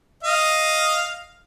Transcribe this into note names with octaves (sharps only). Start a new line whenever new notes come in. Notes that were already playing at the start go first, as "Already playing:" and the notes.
D#5 F5